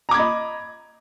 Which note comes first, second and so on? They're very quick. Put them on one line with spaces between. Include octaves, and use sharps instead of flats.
A#5 D6 G#6 B5 D#5